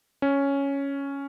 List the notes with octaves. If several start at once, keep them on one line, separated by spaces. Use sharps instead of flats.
C#4